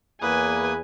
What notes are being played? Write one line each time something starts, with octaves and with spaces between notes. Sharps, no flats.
E2 A#3 B4 G#5 D#6